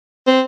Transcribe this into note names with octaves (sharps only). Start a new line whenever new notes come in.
C4